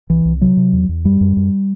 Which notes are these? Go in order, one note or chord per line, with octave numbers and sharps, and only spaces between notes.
C2 E3
C2
C3 F#3
C3
E2
E2
F#2 G3
F#2
F#2